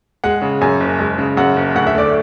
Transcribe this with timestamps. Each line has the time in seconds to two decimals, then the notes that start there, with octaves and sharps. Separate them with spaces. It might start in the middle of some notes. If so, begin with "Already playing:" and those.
0.24 G#3 F#5
0.42 C#3
0.61 F#2 G#5
0.80 F#1
0.99 G#3
1.18 C#3
1.37 F#2 F#5
1.56 F#1
1.75 D2 F#5
1.87 E5
1.95 A3 D5